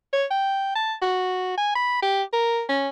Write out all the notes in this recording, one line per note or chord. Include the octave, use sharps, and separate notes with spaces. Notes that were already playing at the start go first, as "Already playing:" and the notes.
C#5
G5
A5
F#4
G#5
B5
G4
A#4
C#4